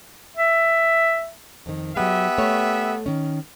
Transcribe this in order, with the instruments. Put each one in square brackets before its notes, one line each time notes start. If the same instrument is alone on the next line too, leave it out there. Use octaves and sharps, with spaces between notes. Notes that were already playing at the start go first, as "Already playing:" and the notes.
[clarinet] E5
[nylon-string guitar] F2 D#3
[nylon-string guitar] F#3 G#3 [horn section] B3 G4 E5
[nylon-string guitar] A3 C#5
D#3 C#4